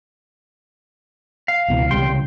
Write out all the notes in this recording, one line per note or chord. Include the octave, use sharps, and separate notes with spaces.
F5
C#2 B2 E3
C2 C#3 G3 G5 C6